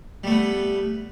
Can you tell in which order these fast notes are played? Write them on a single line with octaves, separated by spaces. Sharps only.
G3 A3 B3